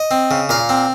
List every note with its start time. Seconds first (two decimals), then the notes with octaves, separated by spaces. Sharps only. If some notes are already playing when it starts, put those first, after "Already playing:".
Already playing: D#5
0.11 C4
0.31 C#3
0.49 A#2 F5
0.69 C4